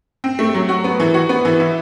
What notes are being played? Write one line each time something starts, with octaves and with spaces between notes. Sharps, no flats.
C4
A3
F#3
F#4
B3
E3
F#4
B3
E3
E4